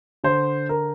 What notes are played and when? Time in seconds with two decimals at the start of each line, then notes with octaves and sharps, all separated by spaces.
0.24 D3 C5
0.69 A#4